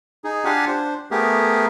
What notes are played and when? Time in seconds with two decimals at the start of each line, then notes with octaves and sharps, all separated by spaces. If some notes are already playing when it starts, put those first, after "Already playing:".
0.24 D#4 G#4
0.45 D4 F4 G4 F5 F#5 G#5
0.68 D4 C5
1.11 A3 B3 G4 G#4 A#4